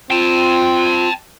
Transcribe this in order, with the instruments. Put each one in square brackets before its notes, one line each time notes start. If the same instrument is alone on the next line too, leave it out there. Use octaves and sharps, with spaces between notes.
[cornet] C4 [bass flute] F4 [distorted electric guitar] G5 A5